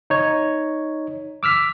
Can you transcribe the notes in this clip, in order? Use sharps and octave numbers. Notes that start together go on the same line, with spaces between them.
D#4 C#5
D6 E6 F6 B6